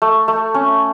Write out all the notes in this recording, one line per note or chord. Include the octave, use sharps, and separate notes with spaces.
A3
A3
C#4